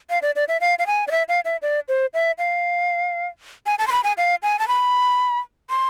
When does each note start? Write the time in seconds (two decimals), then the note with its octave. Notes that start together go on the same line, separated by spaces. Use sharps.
0.10 F5
0.22 D5
0.36 D5
0.48 E5
0.61 F5
0.79 F5
0.87 G#5
1.08 D5
1.11 E5
1.29 F5
1.45 E5
1.62 D5
1.88 C5
2.14 E5
2.38 F5
3.66 G#5
3.79 A5
3.87 C6
3.92 B5
4.04 G#5
4.18 F5
4.43 G#5
4.59 A5
4.68 B5
5.70 C6